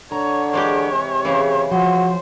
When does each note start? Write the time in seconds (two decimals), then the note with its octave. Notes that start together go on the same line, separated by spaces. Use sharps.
0.12 D3 C#5 A#5
0.53 E3 G#3 G4 C#5
0.92 C3
1.25 C#3 E3
1.71 F3 F#4 C5